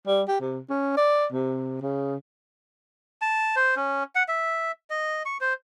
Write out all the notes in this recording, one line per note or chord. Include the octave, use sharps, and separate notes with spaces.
G3
G4
C3
C#4
D5
C3
C#3
A5
C5
C#4
F#5
E5
D#5
C#6
C5